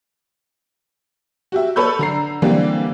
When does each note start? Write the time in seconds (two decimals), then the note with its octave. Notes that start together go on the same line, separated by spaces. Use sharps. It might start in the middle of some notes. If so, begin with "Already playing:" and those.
1.52 F#4 G4 E5
1.76 A4 B4 C#5 B5 E6 G6
1.99 D3 A#5 C7
2.42 D3 E3 G3 A#3 C4